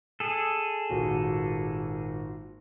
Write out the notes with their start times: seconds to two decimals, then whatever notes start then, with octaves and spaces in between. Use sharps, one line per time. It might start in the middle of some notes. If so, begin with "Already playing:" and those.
0.20 G#4 A4
0.90 G#1 A#2 F#4